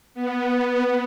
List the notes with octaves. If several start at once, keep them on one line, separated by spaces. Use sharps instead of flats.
B3